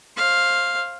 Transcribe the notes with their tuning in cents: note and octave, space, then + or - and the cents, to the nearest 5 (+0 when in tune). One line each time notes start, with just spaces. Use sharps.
C5 +30 F5 +0